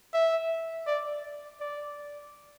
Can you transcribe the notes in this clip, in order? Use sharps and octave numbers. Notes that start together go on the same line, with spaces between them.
E5
D5
D5